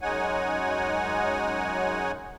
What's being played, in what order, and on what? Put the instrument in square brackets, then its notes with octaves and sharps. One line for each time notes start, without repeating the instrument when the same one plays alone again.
[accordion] F#2 G#3 D#4 C#5 F#5 G#5